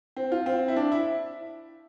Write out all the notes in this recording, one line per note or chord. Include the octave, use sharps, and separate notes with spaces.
C4
F4
C4
E4
D4
E4